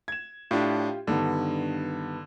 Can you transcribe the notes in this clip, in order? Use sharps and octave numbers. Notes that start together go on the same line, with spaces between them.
G#6 E7
A2 D4 F4 G4
G2 D3 D#3 B3